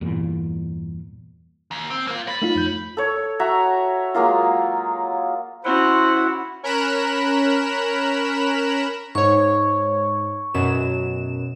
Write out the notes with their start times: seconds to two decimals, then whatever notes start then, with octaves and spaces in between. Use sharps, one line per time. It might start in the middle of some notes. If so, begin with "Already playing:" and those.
0.01 E2 G2 A#2
1.71 D#2
1.90 C4
2.07 A#3 F4
2.27 C#5 B5 A6 A#6
2.42 A3 D#4 F4
2.55 F2 G6
2.97 A4 C#5
3.40 F#4 E5 A#5
4.14 F#3 G#3 A#3 F4
5.64 C#4 E4 F#4 C5 F#5
6.63 C#4 A#4 A#5 B5 F#6 E7
9.15 G#2 C#5 C#6
10.54 F#2 B2 E7